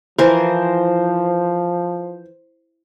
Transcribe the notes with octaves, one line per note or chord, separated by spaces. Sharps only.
E3 F3 A#4 C5